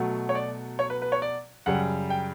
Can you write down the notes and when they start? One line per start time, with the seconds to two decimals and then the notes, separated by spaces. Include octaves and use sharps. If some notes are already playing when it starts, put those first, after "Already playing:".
Already playing: B2 F#3 A3
0.29 C#5
0.35 D5
0.79 C#5
0.90 B4
1.02 B4
1.12 C#5
1.22 D5
1.66 F#2 C#3 G3 F#5
2.10 G5